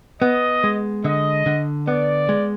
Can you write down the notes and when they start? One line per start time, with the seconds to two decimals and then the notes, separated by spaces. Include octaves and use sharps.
0.22 B3 D#5
0.64 G#3
1.04 D3 D#5
1.46 D3
1.87 B3 D5
2.29 G#3